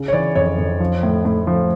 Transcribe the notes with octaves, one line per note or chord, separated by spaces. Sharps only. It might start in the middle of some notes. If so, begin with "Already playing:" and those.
Already playing: C#3
C#5
E3 D5
F2 C#5
F2
F3
A2
A2
F3